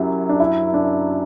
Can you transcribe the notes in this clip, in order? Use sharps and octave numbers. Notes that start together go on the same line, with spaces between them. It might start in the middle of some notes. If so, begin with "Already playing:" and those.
Already playing: F#2 F#3 E4 F#4 G4
D4
E4
D4